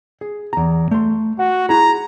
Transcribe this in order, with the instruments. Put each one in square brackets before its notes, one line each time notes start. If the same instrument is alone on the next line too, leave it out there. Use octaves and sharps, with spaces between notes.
[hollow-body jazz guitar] G#4
E2 A#5
A3 C6
[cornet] F#4 [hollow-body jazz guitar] F#5
[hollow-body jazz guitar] E4 G#4 [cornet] A#5